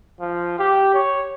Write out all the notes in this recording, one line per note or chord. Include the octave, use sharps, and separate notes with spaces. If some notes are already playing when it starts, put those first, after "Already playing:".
F3
G4
C#5